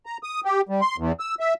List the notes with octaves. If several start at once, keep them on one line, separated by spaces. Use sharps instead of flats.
A#5
D#6
G4
G3
C6
E2
E6
E5